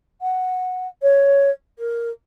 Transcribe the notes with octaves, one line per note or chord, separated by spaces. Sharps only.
F#5
C#5
A#4